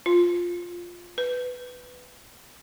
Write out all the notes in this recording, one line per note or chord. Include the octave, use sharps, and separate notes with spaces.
F4
B4